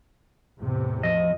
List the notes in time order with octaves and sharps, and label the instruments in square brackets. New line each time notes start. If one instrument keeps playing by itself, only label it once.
[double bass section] E2 A2 C3
[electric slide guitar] F3 D#5